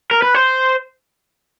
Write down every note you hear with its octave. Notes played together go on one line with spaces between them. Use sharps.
A#4
B4
C5